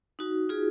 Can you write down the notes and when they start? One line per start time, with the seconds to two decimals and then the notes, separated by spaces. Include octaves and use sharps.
0.19 D#4 F#4
0.49 F4 G#4